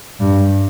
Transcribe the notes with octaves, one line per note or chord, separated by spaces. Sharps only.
G2